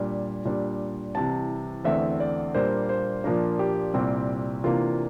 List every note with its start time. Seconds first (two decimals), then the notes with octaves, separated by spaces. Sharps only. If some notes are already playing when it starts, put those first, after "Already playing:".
Already playing: A#2 G3 D4
0.45 A#2 G3 D4
1.15 C2 C3 E3 A5
1.85 E2 D3 A3 C4 E5
2.20 D5
2.55 A#2 G3 A#3 D4 C5
2.89 C5
3.24 A#2 F3 A#3 D4 A#4
3.59 G4
3.94 C2 A#2 G3 C4
4.64 C3 E3 A#3 D4 F4